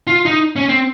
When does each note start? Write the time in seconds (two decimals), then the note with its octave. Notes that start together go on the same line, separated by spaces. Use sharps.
0.07 F4
0.25 D#4
0.56 C#4
0.69 C4